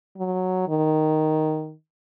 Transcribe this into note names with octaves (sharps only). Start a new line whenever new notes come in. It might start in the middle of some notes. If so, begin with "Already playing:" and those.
F#3
D#3